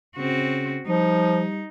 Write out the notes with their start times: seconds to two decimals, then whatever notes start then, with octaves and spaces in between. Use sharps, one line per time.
0.17 C#3 C4 F#4
0.87 F3 G3 D#4